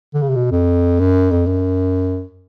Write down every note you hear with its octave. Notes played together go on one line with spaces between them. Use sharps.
D3
C#3
C3
B2
F2
F#2
F2
F#2